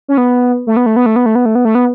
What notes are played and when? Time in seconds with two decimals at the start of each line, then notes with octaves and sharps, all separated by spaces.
0.08 C#4
0.18 B3
0.67 A3
0.77 B3
0.86 A3
0.96 B3
1.06 A3
1.16 B3
1.26 A3
1.35 B3
1.46 A3
1.55 B3
1.65 A3
1.75 B3